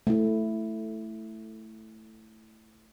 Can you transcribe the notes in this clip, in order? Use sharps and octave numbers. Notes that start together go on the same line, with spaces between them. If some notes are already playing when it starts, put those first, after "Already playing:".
A3 E4